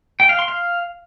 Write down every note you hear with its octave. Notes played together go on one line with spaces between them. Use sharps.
G5
F5
C6
F5